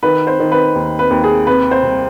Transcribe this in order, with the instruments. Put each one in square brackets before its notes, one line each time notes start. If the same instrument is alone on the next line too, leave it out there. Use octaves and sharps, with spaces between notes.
[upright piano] D#3 B4
C5
D#3
B4
D#2
B4
D#2
G#4
C3 B4
C5
C2